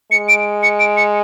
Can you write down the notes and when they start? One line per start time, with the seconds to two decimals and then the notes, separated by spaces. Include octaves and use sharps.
0.11 G#3 C#7
0.29 D7
0.63 C#7
0.80 D7
0.97 C#7